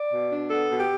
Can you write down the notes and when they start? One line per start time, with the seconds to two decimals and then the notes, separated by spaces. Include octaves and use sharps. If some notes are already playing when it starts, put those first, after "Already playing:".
Already playing: D5
0.12 B2
0.32 D4
0.50 B3 A4
0.69 B2
0.79 G4